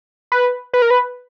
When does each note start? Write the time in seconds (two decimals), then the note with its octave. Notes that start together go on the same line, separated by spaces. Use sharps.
0.32 B4
0.73 B4
0.82 A#4
0.90 B4